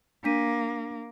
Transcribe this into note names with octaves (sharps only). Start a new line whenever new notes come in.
A#3 D4 B6 D#7